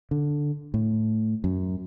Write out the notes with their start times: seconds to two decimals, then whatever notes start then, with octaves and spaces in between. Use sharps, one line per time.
0.11 D3
0.74 A2
1.44 F#2